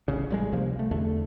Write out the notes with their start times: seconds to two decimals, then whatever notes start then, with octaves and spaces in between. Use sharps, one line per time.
0.08 D1 A1 D#2 C#3
0.30 A1 G3 G#3
0.52 C#2 C3 F3 A#3
0.79 A3
0.91 E2 D3 A3